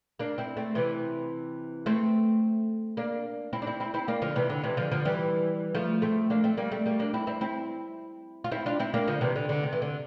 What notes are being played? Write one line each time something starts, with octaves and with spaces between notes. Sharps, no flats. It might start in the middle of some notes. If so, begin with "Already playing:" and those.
A#3 D4
C4 E4
A3 C4
C3 E3
A3 C4
A#3 D4
C4 E4
D4
C4 E4
C4 E4
C4 E4
A#3 D4
D3 F3
C3 E3
D3
C3 E3
D3 F3
D3 F3
E3 G3
F3 A3
A3 C4
A#3 D4
A3 C4
G3 A#3
A3 C4
G3 A#3
A#3 D4
C4 E4
C4 E4
C4 E4
F4
C4 E4
D4 F4
C4 E4
A#3 D4
D3 F3
C3 E3
D3
D3
C3
E3
D3